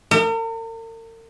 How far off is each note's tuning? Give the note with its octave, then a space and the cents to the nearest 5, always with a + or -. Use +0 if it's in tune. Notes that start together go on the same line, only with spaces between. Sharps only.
A#4 -45